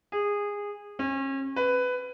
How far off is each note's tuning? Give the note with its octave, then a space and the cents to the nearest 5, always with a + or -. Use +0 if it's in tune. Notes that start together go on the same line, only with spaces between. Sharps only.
G#4 -20
C#4 -35
B4 +15